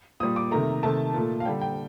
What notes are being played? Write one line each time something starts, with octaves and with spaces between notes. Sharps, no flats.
A#2 G3 D#6
D6
C3 D#3 A3 A#5
C3 D#3 A3 A5
A#2 A3
F5
D3 G3 G5
G5